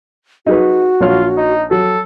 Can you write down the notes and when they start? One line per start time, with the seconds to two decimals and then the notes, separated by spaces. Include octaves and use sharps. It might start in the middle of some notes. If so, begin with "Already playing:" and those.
0.46 D#4 F#4 G#4 B4
1.00 A#1 F4 C#5 F6
1.37 D#4
1.71 F#3 A4